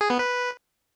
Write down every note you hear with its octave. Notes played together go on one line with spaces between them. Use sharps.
G#4
B3
B4